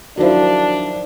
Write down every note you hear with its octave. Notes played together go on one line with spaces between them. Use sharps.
D#3 F3 F#3 D4 E4